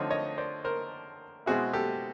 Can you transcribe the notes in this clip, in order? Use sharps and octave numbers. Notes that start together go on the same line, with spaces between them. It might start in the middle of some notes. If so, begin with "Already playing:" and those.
Already playing: D3 F3 A3 C4 D#4 C#5 D#5
C#5 D#5
C5 D5
A#4 C5
B2 G#3 C4 E4 F#4 G#4
G4 A4